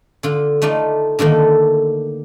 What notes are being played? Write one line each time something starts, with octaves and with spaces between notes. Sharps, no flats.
D3 F4
A3 D#4 F4 D5
D3 D#3 A3 A#3